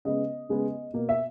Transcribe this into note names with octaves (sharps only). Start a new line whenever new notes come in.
C#3 G#3 B3 D#5
C#3 G#3 B3
B2 A#3
E5